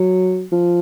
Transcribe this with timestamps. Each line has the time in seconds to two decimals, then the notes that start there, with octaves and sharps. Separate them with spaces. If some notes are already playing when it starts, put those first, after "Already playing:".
Already playing: F#3
0.52 F3